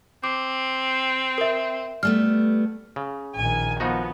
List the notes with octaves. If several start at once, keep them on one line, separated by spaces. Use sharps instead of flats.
C4 D6
A#4 E5
G3 A3 B3 F6
C#3
A#1 D#3 G#5
F3 B3 D#4 F#4